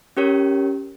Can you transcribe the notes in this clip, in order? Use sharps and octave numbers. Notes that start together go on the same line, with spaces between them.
C#4 G4 A#4 C#5